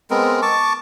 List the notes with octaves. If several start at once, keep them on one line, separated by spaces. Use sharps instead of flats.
G#3 B3 C4 A#4
A5 C#6 D6